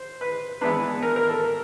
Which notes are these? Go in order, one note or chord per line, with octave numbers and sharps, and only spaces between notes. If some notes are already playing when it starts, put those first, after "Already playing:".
Already playing: C5
B4
E3 G#3 B3 D4 B4
A#4
A#4
A4